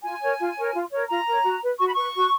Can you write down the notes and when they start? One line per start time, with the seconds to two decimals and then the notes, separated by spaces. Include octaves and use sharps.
0.02 F4 G#5
0.21 A#4 C#5
0.38 F4
0.56 A#4 C#5
0.73 F4
0.91 A#4 C#5
1.09 F4 A#5
1.26 A#4 C#5
1.43 F#4
1.61 B4
1.78 F#4 C#6
1.87 B5
1.95 B4 C#6
2.15 F#4